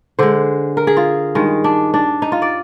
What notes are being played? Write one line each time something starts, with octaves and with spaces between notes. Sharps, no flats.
D3 G#3 C5
A#4
G#4
F4
G2 D#3 G#3
D4
D4
D#4
F4
D5